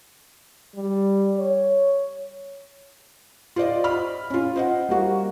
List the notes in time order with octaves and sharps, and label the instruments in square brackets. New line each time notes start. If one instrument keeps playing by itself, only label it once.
[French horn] G3
C#5
[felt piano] F4 C5 D5 D#5
B5 F6
C#4 F4
C5 D#5 F#5
G3 A#3 F#4